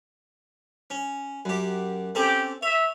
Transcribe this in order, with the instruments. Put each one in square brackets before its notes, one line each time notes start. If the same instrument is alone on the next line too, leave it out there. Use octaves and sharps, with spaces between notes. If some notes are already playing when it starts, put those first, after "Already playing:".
[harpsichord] C#4
F#2 G4
[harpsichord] C4 C#4 A4 [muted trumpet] G4
[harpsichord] C#5 [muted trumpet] E5